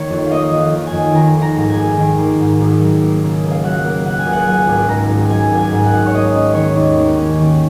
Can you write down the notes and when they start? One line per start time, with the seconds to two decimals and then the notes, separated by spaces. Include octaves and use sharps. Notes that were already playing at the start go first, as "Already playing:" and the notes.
Already playing: D#3 A#3 C#5
0.10 F2
0.27 A#3 D#5 F5
0.52 F2
0.59 F5
0.72 D#3
0.87 G#5
0.93 F2
1.14 D#3 A#5
1.35 A#3
1.42 A#5
1.56 G#2 A#5
1.70 G#5
1.76 G#1
1.97 D#3
2.18 A#3
2.39 G#2
2.60 G#1
2.80 F#3
3.02 A#3
3.22 C#3
3.43 C#2
3.51 F5
3.64 F#3 F#5
3.85 A#3
4.05 C#3 F#5
4.19 G#5
4.26 C#2
4.33 F#5
4.46 F#3 G#5
4.67 G#1
4.88 G#2 A#5
5.09 G#1
5.29 F#3 G#5
5.51 G#1
5.58 G#5
5.72 G#2
5.86 F#5
5.93 G#1
6.06 C#5
6.14 A#3 D#5
6.34 C#4
6.55 D#3 C#5
6.76 D#2
6.97 A#3
7.17 C#4
7.39 D#3